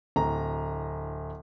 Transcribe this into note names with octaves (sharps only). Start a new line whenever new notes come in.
D1 A#5